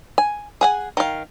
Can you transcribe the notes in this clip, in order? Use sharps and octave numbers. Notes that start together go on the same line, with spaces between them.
G#5
G#4 F#5 G#5
D#3 F5